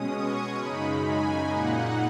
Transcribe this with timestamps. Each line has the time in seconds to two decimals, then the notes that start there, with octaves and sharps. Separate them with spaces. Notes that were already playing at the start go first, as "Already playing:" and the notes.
Already playing: B2 G#3 C#4 D#6
0.11 C#6
0.56 F#2 C#3 G#3 D#4 B5
1.01 G#5
1.46 A#2 A#3 D#4 F#5